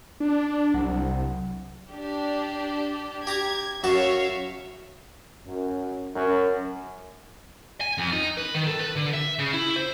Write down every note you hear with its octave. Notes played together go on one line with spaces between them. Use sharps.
D4
C2 F#3
D4 G4
G4 A#5 D6 G#6
F#2 F#4 C#5 E5 F5 A5
F#2
F#2
G#5
F2
D#4
B4
D#3
A4
B4
D3
E5
C#3
E4
C5